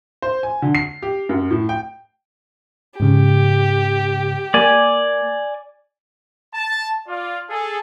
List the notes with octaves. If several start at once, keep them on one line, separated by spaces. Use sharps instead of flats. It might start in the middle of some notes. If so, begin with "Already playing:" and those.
C5
G#5
D3
C7
G4
F#2
A2
G5
G#2 C#3 G4
A#3 D5 G#5
A5
F4 D5 F5
G#4 A4